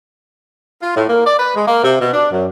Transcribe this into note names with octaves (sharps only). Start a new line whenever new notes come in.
F4
A2
A#3
D5
B4
G#3
A#3
C3
B2
D4
F#2